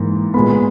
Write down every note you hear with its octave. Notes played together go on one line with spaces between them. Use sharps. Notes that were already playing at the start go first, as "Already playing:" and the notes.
Already playing: G#2 E3 A#3
A#2 G#3 B3 B5